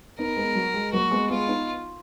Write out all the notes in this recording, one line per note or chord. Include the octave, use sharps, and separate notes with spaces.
B3 D#4 A#4
G#3 B3
F#3
G#3
F#3 A#3 F#4
G#3 B3
G#3 B3 F4
B3 D#4